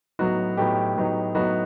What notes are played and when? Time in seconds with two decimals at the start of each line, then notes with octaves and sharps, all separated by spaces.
0.19 A2 F#3 B3 D#4 F#4
0.57 A2 F#3 B3 D#4 G4
0.97 A2 F#3 B3 D#4
1.35 A2 F#3 B3 D#4 F#4